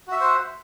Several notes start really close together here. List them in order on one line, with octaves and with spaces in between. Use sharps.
F#4 E5 F#5 C5